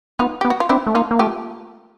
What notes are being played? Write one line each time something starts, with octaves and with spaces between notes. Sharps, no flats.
B3 D#4 F4
B3 G4
F#4
F4
C4 D4 E4
A3
A#3 D#4 F4
A#3
A3 F4 G4